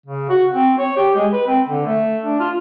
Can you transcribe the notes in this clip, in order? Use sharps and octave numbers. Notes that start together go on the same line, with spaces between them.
C#3
F#4
C4
C#5
G4
G#3
B4
C4
D3
A3
D4
F4